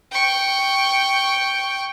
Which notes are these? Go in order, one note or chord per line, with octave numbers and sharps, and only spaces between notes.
G5 C#6